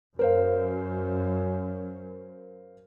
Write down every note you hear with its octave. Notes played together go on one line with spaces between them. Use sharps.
F#2 A#4 C5 F5